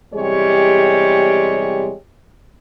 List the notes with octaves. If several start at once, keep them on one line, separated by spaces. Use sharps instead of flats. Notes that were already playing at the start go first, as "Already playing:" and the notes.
E2 C3 G3 G#3 G4 C#5